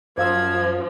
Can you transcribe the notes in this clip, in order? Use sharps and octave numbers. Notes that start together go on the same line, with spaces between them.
F#2 F3 C5 F5 E6 G#6